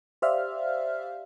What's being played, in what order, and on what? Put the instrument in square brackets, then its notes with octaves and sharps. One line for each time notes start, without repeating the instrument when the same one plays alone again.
[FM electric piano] G4 C5 D5 E5 F5 F6